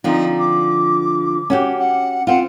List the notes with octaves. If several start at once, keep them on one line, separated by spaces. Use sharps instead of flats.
D3 F3 C4 D#4
D6
C#4 F#4 G4
F#5
C4 F4 F#5